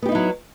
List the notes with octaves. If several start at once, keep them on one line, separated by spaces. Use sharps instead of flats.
F#3 B3 D#4 E4 G4